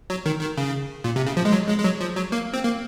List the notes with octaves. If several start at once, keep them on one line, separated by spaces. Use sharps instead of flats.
F#3
D#3
D#3
C#3
A#2
C3
C#3
F3
G#3
F#3
G#3
G#3
F#3
F3
F#3
A#3
C4
A#3